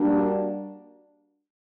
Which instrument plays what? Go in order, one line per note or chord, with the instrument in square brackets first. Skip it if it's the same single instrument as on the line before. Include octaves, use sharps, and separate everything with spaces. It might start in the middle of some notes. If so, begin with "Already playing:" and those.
Already playing: [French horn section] G3 A#3 D4 F#4